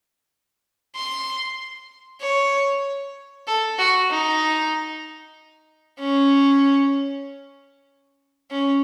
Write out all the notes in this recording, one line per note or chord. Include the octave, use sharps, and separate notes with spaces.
C6
C#5
A4
F#4
D#4
C#4
C#4